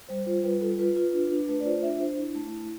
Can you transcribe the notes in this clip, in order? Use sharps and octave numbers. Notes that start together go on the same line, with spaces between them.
G3 C5
F4 C5
G3 B4
F4 A4
F4 B4
F4
D4
D4
A3 B4
D5
F4 C5
D4 E5
D4 C5
E4
A3
E4